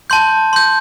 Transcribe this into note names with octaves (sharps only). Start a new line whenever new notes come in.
A5 C6 G6
C6 G6